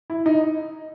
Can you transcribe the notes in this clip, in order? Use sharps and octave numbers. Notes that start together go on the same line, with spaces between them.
E4
D#4